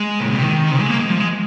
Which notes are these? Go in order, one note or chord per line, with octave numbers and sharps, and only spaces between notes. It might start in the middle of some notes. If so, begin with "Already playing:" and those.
Already playing: G#3
A#2
C3
D#3
C3
G#3
A#3
G#3
F3
G#3